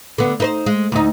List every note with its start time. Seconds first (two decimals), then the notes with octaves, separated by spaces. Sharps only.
0.18 D3 B3
0.40 D#4 B4 C5
0.66 G#3
0.92 D2 D#4